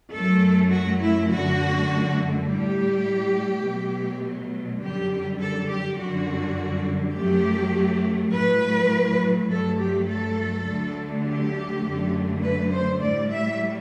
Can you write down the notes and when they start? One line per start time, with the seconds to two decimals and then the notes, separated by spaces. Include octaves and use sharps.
0.13 F#2 F#3 A3 A4
0.71 F#4
1.02 E4
1.30 F#2 D3 A3 F#4
2.47 A2 G3 G4
3.64 B2 F#3 A3
4.81 F#2 D3 G3 G4
5.40 A4
5.69 G4
5.99 F#2 D3 G3 F#4
7.15 F#2 F#3 A3 G4
8.33 A2 F#3 A3 B4
9.49 G2 F#3 A3 A4
9.79 G4
10.08 A4
10.66 D2 D3 F#3 A3
11.25 G4
11.84 F#2 D3 F#3 A3
12.42 B4
12.71 C5
13.01 A2 G3 D5
13.30 E5